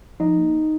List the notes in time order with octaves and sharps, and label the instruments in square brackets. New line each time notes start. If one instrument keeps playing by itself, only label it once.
[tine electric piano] F3 D#4 D#5
A#3